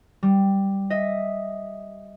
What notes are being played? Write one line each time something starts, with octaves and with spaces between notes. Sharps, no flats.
G3
D#5 E5